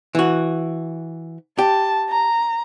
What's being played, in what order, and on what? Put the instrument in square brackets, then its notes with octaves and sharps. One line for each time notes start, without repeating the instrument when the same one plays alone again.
[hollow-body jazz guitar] E3 F#4
[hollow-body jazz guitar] G4 [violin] A5
[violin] A#5